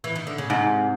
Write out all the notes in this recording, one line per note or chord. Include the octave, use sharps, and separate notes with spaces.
E3
D#3
D3
C#3
G#2 C3